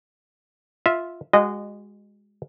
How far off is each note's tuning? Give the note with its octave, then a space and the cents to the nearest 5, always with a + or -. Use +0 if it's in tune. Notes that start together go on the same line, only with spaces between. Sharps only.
F4 +0 E5 -15
G#3 -20 F#4 +0 D#5 -25